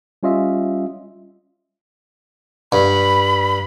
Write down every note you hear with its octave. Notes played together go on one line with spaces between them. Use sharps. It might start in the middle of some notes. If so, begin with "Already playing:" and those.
G3 C#4 F4 D#5 E5
G2 B5